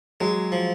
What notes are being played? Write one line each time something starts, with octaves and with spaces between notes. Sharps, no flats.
F#3 G#3
F3